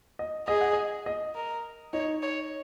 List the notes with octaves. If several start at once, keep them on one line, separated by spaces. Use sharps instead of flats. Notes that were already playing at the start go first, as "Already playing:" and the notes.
D#5
G#4 D#5
F#5
D#5
D#5
A#4
D#4 C#5
C#5